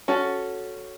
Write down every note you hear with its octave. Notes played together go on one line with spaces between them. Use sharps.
C#4 F#4 A4